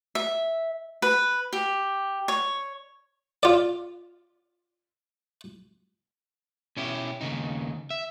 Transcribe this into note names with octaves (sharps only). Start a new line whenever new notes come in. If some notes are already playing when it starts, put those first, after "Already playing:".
E5
B4
G4
C#5
F4 D5
B2 C#4 E4 G4
D#2 C#3 D#4
E5